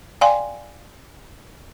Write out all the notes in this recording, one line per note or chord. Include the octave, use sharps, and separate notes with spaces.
D5 F5 G5 G#5 C6